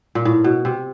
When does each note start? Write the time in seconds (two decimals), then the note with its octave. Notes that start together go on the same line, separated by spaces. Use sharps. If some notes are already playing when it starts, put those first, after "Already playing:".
0.15 A#2
0.25 A2
0.44 B2
0.65 C3